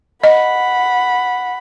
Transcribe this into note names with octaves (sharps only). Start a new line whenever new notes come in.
D#5 F#5 B5